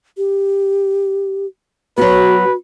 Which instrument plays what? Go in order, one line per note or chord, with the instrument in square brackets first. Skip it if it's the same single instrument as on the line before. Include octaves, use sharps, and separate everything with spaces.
[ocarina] G4
[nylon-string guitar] F#3 B3 [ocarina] F#4 [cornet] B4